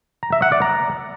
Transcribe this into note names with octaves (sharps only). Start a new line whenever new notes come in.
A#5
E5
F#5
D5
A#5